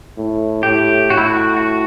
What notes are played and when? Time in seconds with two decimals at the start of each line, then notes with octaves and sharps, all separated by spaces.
0.17 A2
0.63 A2 G4
1.10 A2 F#4
1.17 E4
1.24 F#4
1.57 F#4